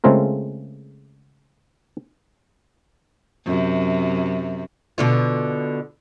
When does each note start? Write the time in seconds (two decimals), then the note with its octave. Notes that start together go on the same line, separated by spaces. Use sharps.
0.04 C#3 G#3 A3 C4 F4 A#4
3.46 F#2 C3
4.98 B2 D3 F4